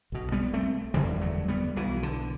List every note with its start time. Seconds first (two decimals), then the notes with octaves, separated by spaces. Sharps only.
0.12 B1 B2
0.32 G3 B3
0.54 A3 C4
0.94 F#1 E2 D3 E3 G3
1.21 F#3 A3
1.48 G3 B3
1.76 B1 B2 E3
2.03 D3